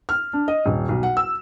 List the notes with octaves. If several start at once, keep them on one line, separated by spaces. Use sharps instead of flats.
F6
D4
D#5
D#1
B1
F#5
E6